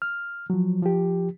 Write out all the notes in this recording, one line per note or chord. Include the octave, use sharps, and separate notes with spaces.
F6
F3 F#3
F3 G4